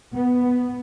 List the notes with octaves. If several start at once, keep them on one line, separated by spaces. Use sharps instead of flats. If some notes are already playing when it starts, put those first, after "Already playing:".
B3